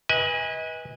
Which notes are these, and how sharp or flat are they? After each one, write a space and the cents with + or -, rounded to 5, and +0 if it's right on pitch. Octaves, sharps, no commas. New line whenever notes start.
B4 -15 D#5 +35 G#5 -20